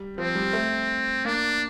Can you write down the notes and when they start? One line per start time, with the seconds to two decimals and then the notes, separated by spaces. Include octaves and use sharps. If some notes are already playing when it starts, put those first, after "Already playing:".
Already playing: G3
0.17 F3 C4
0.35 G3
0.53 A3
1.25 A#3 D4